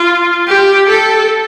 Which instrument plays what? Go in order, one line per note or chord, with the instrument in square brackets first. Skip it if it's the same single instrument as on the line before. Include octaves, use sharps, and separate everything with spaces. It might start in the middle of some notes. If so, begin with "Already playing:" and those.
Already playing: [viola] F4
G4
A4